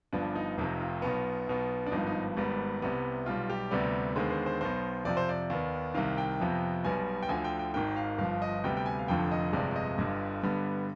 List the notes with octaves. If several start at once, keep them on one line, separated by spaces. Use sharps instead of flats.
G1 G2 F3 B3 D4
D#4
F1 F2 C3 F3 D#4
F4
B1 B2 B3
B1 B2 B3
D4
G#1 G2 F3 B3 D#4
D#4
G#1 G#2 G3 B3
C2 C3 G3 B3
B1 B2 G3 F4
G4
D2 C3 G3 B3 D5
D#2 D3 G#3 B3 C5
C5
C5
B1 B2 B3 C5
F2 C3 F3 D5
C5
D5
D#2 D#3 B3
C2 C3 D#3 F5
G5
F2 C3 F3 B3
B1 B2 G3 B3 G#5
G5
D2 D3 F3 G#5
G5
G5
G#1 G#2 D#3 G5
F5
G1 G2 F3 F5
D#5
D2 C3 G3 B3 G5
G5
G#5
F5
F1 F2 D3 F3 G5
D#5
G1 F2 C3 F3 G#3 D5
D5
D#5
G1 G2 D3 G3
G2 D3 G3 B3